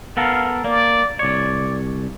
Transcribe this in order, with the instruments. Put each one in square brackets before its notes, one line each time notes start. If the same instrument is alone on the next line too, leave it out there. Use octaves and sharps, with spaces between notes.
[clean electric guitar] B3 A4 A#4 [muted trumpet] F5
[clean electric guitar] A#3 [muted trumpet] D5
[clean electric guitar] C2 C#5 [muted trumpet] D5